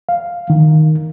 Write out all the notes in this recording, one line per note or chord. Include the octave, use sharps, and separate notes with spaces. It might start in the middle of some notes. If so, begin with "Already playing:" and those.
F5
D#3